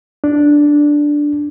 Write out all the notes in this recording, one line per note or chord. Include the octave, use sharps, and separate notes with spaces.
D4